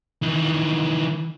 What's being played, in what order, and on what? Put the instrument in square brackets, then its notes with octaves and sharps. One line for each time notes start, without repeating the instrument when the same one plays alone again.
[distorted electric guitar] D#3 E3